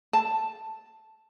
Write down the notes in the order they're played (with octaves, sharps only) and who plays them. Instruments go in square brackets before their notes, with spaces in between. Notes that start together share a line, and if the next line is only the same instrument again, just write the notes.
[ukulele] A5